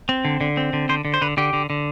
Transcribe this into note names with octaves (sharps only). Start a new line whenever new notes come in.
C4
D3
D3
C4
D3
D3 C5
D3
C5
D3 B4
D3 G4
D3
D3